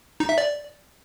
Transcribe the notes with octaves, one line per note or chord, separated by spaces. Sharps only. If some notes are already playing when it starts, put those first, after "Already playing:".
D#4
E5
D5